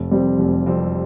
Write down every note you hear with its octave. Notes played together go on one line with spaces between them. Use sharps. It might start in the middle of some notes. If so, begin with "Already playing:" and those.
Already playing: F1
F2 C3 G3 C4
F1
F2 C3 G3 C4